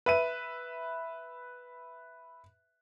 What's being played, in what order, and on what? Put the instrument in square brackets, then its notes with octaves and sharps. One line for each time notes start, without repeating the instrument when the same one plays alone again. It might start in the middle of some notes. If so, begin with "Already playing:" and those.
[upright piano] B4 E5 D#7